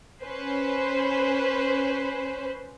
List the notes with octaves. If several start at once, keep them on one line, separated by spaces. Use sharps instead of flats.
C#4 B4 C5